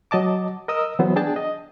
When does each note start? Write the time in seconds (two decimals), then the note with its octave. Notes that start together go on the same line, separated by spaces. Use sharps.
0.11 F#3 D#5 A5 D6
0.68 A#4 D#5 D#6 E6
0.99 E3 F#3 B3 C5
1.16 D4 G#4 G5 A5
1.36 D#5